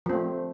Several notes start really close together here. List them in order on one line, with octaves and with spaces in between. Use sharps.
F3 C4 A3